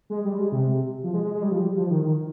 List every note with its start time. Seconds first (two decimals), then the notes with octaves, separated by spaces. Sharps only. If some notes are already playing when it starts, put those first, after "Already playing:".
0.10 G#3
0.25 G3
0.39 G#3
0.52 C3
1.04 F3
1.14 G#3
1.24 G#3
1.34 G#3
1.43 G3
1.51 F3
1.59 G3
1.76 F3
1.90 D#3
2.03 D#3